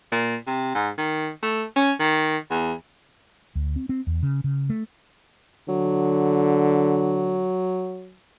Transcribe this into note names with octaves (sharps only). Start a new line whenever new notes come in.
A#2
C3
G#2
D#3
A3
C#4
D#3
E2
D2
C4
C4
E2
C#3
C#3
A3
D3 F#3